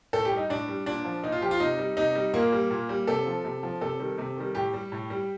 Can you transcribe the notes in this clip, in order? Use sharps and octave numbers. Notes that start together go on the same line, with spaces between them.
A2 A4
G4
G3
D#4
A2 D4
G3
A#2 D4
F3
A#2 D#4
F4
F3 G4
F4
C3 D#4
G3
C3 D#4
G3
A#2 A#3
G3
A#2
G3
C3 A4
F3
C3
F3
C3 A4
D#3 G3
C3
D#3 G3
A2 G4
G3
A2
G3